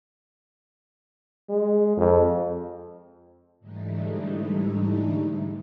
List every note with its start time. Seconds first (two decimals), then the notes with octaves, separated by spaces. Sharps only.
1.50 G#3
1.97 F2
3.60 G#2 D3 E3 G3 A3 D#4